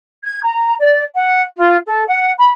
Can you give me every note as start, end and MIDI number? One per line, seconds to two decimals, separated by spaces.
0.23 0.40 92
0.41 0.73 82
0.78 1.02 74
1.15 1.41 78
1.57 1.76 65
1.86 2.03 69
2.06 2.31 78
2.37 2.49 83